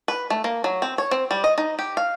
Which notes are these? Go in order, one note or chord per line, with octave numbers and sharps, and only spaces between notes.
B4
A3
A#3
F#3
C4
C#5
C4
G3
D#5
D#4
G4
F5